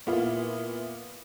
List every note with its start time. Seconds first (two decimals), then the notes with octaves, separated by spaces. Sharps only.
0.07 A#2 B3 E4 F4